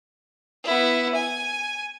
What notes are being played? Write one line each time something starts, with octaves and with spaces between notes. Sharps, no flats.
B3 E4
G#5